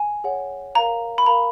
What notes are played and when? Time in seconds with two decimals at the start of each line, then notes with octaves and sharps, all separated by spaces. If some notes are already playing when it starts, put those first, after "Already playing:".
Already playing: G#5
0.24 G#4 C#5 F#5
0.75 A#4 F5 A#5
1.18 B5
1.26 A#4 F5 A#5